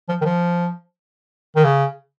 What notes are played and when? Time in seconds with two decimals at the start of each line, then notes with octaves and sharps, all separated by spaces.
0.09 F3
0.21 D#3
0.25 F3
1.56 D#3
1.64 C#3